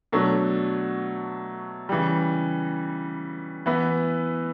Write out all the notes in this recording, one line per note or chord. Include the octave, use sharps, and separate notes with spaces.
B2 F#3 A3 D4
C#3 E3 G3
E3 B3 E4 B4